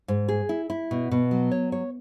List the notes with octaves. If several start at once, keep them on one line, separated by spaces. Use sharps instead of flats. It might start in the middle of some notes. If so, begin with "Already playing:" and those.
G#2
G#4
E4
E4
B2
B2
F#3
C#5
C#5